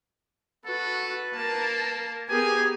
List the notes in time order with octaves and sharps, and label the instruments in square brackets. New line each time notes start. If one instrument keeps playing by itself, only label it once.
[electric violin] F#4 [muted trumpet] A4 [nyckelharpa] B4
[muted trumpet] A#3 [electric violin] A#4 A5
[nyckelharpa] B3 A#4 [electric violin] G4 G#4 [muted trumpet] G#5